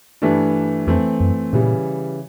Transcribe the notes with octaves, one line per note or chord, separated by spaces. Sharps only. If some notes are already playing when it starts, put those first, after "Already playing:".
G2 E3 A3 D4
F2 E3 A3 C4
F#2
A#2 C#3 E3 G3